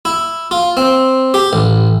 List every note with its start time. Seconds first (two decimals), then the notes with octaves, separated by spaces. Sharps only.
0.05 E4
0.51 F4
0.77 C4
1.34 G4
1.53 A1